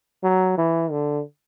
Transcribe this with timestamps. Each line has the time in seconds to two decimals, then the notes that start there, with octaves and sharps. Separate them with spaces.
0.23 F#3
0.58 E3
0.91 D3